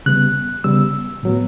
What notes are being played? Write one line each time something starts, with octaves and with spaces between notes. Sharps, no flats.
C#3 G3 B3 F#6
C#3 G3 B3 E6
A2 F#3 B3